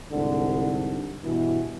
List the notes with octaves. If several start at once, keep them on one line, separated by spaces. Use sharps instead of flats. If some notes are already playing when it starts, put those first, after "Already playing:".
C2 G#2 D3
G2 B2 E3